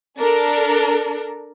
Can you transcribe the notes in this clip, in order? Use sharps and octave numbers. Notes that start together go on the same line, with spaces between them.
D4 A4 A#4